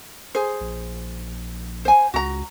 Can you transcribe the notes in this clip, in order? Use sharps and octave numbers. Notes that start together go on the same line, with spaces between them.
G#4 C5
A#1
C5 G#5
C#2 F#4 A#5